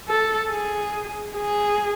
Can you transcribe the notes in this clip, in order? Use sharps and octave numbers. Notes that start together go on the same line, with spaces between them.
A4
G#4
G#4